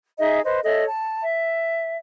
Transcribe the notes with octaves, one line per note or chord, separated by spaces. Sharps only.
D#4 G#4 D#5 E5
B4 C5 D#5
A4 C#5 D#5 E5
A5
E5